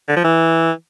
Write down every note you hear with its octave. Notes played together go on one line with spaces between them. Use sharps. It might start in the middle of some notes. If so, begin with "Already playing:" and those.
D3
F3
E3